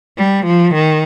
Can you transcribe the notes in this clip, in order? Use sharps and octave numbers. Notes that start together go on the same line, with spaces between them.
G3
F3
D#3